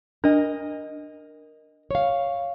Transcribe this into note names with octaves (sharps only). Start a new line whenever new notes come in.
D4 A#4 D#5
C#5 F5